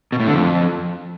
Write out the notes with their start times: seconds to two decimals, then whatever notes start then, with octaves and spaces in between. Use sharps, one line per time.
0.12 B2
0.20 A2
0.27 D3
0.34 F2